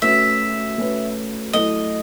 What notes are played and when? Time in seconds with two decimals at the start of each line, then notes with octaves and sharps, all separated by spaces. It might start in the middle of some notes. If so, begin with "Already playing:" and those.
0.02 A3 C#4 F#4 B4 E5
0.78 A3 C#4 F#4 B4
1.53 F#3 A3 E4 A4 D#5